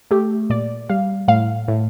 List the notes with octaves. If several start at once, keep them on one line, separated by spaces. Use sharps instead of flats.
A3 G4
A#2 D5
G3 F5
A2 F5
A2